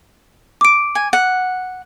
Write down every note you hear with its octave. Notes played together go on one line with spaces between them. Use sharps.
D6 D7
G#5
F#5